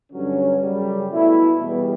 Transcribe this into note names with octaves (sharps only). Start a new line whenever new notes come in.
G2 D3 F#3 C#4
F#2 C#3 G3
B2 A3 E4
E2 B2 G3